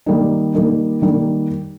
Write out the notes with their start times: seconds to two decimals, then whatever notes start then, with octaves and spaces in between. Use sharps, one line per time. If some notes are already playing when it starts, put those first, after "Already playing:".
0.06 D#3 G3 A#3 D#4
0.55 D#3 G3 A#3 D#4
1.02 D#3 G3 A#3 D#4